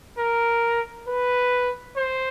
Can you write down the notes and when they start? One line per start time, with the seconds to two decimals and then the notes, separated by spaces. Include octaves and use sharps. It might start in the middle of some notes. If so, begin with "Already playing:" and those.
0.18 A#4
1.08 B4
1.97 C5